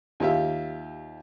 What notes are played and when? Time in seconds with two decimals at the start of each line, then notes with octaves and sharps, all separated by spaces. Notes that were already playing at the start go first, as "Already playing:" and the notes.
0.20 D#2 F4 G4 E5